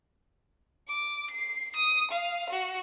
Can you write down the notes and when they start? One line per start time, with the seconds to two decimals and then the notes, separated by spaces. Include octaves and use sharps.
0.88 D6
1.31 C7
1.76 D#6
2.11 F5
2.50 F#4